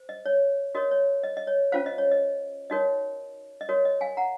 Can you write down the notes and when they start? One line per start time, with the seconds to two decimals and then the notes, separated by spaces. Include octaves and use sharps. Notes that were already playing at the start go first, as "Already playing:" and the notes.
Already playing: C5
0.09 D#5
0.26 C#5
0.75 F#4 A#4 C#5 D#5
0.91 C#5
1.24 D#5
1.37 D#5
1.47 C#5
1.72 C#4 F4 C5 F5
1.86 D#5
1.98 C#5
2.11 D#5
2.70 D#4 F#4 A#4 C#5 D#5
3.61 D#5
3.69 F#4 A#4 C#5
3.85 D#5
4.01 F5 G#5
4.17 F#5 A#5